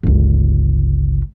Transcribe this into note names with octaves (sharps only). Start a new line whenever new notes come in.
G1 C#2